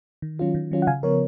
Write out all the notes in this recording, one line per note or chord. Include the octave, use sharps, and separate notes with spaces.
D#3
F#3 C#4 F4
D#3
F#3 C#4 F4
F#5
C#3 F5 G#5
F3 B3 A#4 C#5